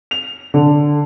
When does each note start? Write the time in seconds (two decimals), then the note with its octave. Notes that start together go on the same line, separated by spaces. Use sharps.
0.11 F7
0.54 D3